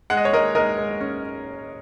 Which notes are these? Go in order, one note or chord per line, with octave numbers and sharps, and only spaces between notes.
G#3 F#5
D#5
C#5
G#3 A#4 D#5
G#3 A#4 D#5
G#3
C#4